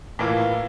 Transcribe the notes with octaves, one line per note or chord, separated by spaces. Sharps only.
A2 E3 A#3 F4